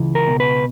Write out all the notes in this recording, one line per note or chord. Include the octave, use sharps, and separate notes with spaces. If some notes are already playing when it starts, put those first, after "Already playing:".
Already playing: C#2 E3
A#4
B2
B4